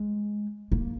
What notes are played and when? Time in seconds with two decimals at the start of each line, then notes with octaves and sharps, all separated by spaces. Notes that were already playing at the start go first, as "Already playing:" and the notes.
Already playing: G#3
0.72 A#3